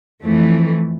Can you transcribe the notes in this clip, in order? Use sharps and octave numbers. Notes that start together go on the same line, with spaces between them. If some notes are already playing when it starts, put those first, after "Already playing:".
F2 E3 A3